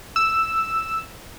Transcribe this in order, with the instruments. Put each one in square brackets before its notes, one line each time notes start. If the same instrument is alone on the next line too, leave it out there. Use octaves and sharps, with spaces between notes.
[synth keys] E6